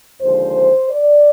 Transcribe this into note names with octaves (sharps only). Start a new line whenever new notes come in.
D#2 D3 F3 G#3 C5
D5